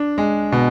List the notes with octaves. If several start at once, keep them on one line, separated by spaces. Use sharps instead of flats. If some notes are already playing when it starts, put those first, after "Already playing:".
Already playing: D4
G#3
B2